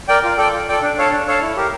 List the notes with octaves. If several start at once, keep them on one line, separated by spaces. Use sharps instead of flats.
A#4 D5 G5
F4
A4 D5 G5
F4
A4 D5 G5
D4
A4 C#5 F5 A5
D4
A4 C#5 F5 A5
E4
G4 A#4